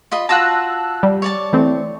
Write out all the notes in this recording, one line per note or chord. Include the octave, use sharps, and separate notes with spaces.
F4 D#5 B5
F4 F#4 A5 A#5 E6 F#6
G3
C#5 D5 A5
E3 A3 C4